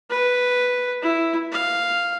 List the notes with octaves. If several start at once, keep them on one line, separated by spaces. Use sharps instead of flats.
B4
E4
F5